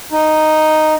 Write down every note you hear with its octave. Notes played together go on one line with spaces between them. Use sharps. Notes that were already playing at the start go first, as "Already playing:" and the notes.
D#4